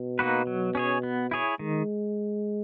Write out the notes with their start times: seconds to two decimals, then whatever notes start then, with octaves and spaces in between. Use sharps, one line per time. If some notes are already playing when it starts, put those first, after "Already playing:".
Already playing: B2
0.19 A#3 D#4 F#4 B4
0.47 F#3
0.75 C#4 G#4 C#5
1.03 B3
1.31 E4 G#4 C#5
1.59 D#3 G#3